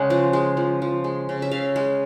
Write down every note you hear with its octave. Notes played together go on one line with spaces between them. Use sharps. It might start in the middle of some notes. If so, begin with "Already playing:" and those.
Already playing: C#3 G#3 F#5
F3
G#3
F3
F3
G#3
C#3
E5
C#3 F5
G#3